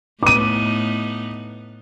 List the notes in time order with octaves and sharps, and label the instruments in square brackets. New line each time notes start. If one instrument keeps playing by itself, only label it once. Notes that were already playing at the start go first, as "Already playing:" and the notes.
[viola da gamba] A2 B3 D#4 [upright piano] D6 D#7